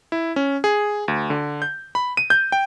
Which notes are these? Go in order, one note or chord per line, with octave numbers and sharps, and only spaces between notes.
E4
C#4
G#4
D2
D3
G6
B5
D#7
G6
G5